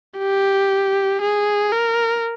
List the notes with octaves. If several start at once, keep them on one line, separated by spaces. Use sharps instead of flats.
G4
G#4
A#4